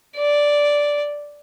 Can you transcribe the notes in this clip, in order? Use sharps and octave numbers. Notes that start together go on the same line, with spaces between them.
D5